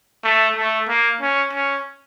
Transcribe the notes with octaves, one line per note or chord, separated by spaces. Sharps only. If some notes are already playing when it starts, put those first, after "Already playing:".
A3
A3
A#3
C#4
C#4